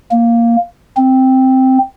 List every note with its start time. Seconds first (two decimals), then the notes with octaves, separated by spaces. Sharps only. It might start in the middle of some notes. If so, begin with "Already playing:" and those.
0.11 A#3
0.97 C4